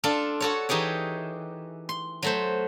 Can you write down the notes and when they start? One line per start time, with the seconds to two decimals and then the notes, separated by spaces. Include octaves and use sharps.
0.04 D4 F4 A4
0.40 F#4 A4 C#5
0.69 E3 D#4 G4 G#4 C#5
1.89 C6
2.22 F#3 A3 C5